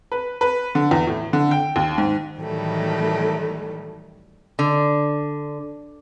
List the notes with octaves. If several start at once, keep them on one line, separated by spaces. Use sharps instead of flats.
B4
B4
D3
E2
A2
D3
G5
D#2
G#2
A2 D#3 E3 F#3 G3 A3
D3